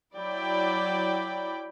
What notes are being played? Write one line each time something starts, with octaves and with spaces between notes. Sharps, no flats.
F#3 E4 D5 G5 B5